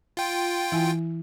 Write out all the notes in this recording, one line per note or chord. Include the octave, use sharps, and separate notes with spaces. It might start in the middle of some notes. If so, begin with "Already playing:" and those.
F4 G5
E3 E4 G#5